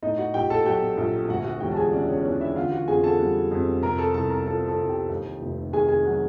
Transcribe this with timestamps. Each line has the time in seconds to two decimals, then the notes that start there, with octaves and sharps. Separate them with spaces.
0.03 A2 D#4 D#5
0.18 F#4 F#5
0.34 A#1 G4 G5
0.50 A4 A5
0.65 F#3 G4 G5
0.97 A#1
1.29 D2 F#4 F#5
1.45 F#4 F#5
1.60 E1 G4 G5
1.72 A5
1.77 G#4 G#5
1.92 C#3 D4 D5
2.08 C#4 C#5
2.18 C#5
2.25 E3 D4 D5
2.40 E4 E5
2.56 D3 F4 F5
2.72 F#4 F#5
2.88 F2 G#4 G#5
3.04 A4 A5
3.19 G3
3.51 F2
3.83 C3 A#4 A#5
3.98 A4 A5
4.14 C2 A4 A5
4.30 A#4 A#5
4.47 F3 A4 A5
4.68 A4 A5
4.78 C2
4.89 G4 G5
5.10 D#2
5.41 F1
5.73 D#3 G#4 G#5
5.89 G#4 G#5
6.05 F#3